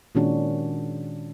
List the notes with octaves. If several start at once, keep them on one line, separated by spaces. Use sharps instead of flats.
A#2 D#3 G#3 C#4 D4 F#4